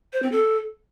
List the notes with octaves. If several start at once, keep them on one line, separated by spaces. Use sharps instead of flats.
C5
C4
A4